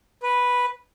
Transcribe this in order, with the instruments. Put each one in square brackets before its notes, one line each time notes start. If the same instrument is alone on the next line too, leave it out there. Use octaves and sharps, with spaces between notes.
[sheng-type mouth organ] B4